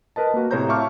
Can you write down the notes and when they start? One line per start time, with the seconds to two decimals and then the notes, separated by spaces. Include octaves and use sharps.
0.16 A#4 B4 D#5 A5
0.34 A#3 F#4
0.51 A2 C3 C5 C#5 A#5 G6
0.69 E5 F5 A5 C#6 D6 F6